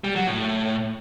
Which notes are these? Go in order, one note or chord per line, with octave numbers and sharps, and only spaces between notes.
G3
F#3
A2